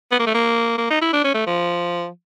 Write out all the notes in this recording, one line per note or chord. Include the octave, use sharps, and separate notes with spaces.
B3
A#3
A3
A#3
A#3
D#4
E4
D4
C#4
A3
F3